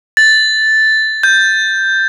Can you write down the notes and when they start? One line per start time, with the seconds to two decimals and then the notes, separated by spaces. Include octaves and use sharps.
0.17 A6
1.23 G6